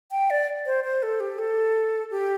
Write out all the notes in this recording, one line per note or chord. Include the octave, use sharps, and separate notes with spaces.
G5
D5
C5
C5
A4
G4
A4
G4